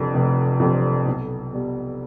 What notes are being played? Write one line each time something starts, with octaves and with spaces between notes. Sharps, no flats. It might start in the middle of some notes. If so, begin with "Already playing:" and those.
Already playing: F1 F2 D3 G3 C4
F1
F2 D3 G3 C4
B1
B2 G3